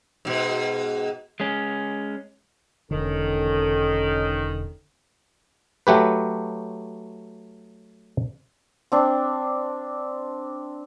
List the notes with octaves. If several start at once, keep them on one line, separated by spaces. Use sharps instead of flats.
G#2 B2
G#3 C#4
E1 D3 D#3 C#4 A4
F#3 A3 G4 B4
C4 D4